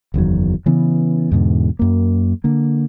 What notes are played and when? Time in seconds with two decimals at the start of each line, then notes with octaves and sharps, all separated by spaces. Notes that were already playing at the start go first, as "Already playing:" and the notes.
0.14 F#1 E2 D#3 F#3
0.66 C#3 E3 B3
1.31 E2 G#2 B2 D3
1.79 F#2 A#3
2.44 D3 A#3